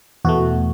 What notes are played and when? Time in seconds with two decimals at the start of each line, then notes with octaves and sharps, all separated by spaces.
0.25 E2 B2 A3 F#4